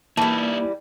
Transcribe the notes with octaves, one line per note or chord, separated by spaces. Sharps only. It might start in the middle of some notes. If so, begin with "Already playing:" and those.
E3 G3 A#3 D#4 E4 A5